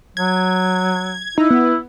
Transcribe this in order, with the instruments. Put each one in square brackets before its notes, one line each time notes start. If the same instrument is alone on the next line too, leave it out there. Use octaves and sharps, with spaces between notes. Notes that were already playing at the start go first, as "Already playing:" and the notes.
[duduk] F#3 [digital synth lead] G#6
[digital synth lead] D#4 [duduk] E4
[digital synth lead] B3